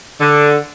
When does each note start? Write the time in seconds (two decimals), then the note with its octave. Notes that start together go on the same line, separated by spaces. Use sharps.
0.21 D3